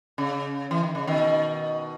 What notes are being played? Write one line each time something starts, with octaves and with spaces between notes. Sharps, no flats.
C#3
E3
D#3
C#3
B2 D#3